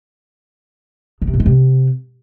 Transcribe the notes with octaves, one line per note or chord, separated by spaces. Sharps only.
D3
C3
A#2
G#3
C3